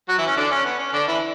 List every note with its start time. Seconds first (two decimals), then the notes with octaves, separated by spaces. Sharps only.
0.08 F#3 F#4
0.18 E3 E4
0.27 C#4
0.37 D3 D4
0.51 C#4
0.65 B3
0.79 C#4
0.93 D3 D4
1.08 E3 E4